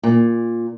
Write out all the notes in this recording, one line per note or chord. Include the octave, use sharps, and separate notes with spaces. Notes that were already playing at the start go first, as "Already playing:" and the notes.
A#2